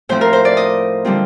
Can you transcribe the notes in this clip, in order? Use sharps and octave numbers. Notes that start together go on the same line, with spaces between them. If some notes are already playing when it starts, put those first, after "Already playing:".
A2 F3 C4 C5
A#4
C5
D5
D#5
D3 G3 C4 F4